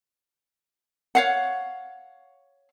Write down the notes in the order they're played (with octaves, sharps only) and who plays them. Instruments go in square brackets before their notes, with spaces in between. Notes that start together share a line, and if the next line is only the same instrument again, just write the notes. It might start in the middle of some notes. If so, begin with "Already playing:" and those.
[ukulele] C#5 F5 F#5